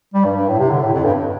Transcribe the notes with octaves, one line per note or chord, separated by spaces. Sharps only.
G3
G2
G2
A2
C3
D3
A2
F2
G2